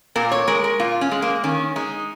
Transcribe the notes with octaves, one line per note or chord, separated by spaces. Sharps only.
A#2 A#4
C#5
G#3 A#4
A#4
A#2 F4
C#4
G#3
A#3
D#3 C#4
G#3 D#4